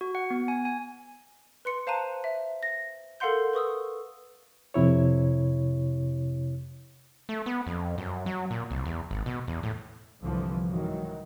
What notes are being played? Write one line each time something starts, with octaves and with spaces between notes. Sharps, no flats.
F#4
F#5
B3
G#5
G#5
B4 C6 C#7
C5 F5 A5 A#5 F#6 D#7
E5
A#6
A4 A#4 F5 F#5 C6 G6
B4 C#6 D#6 E6
F2 C3 E4 C#5
A3
B3
F2
F#2
F#3
A#2
C2
E2
G#1
B2
E2
A2
C2 G2 D3 E3 F3
G#2 D#3 E3 F#3